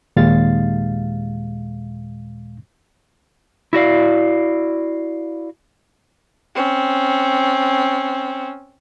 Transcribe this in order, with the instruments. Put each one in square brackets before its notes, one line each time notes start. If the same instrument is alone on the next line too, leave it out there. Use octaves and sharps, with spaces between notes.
[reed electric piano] D#2 A#2 G#3 F5 A6
[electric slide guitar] E4 F#4 D5 F5
[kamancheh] C4 C#4